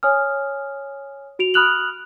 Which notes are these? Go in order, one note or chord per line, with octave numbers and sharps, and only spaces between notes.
C#5 G#5 D#6 F6
F#4 D7 F7
B5 D#6 F6 F#6 F7 F#7